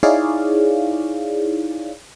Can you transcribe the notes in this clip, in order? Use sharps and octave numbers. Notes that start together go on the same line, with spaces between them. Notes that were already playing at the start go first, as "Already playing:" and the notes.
D#4 E4 G#4 C#5 D5 F5